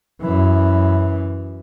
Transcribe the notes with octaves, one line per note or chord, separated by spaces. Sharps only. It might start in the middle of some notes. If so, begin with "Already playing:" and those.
F#2 E3